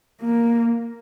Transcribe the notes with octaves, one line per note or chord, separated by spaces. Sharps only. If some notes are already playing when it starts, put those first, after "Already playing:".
A#3